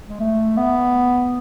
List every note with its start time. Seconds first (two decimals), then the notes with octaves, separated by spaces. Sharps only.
0.09 G#3
0.20 A3
0.57 B3